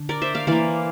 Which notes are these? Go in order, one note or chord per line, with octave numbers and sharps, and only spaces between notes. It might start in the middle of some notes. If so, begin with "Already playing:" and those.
Already playing: D3
A#4 D5
C5 E5
D5 F5
E3 A#3 D5 F5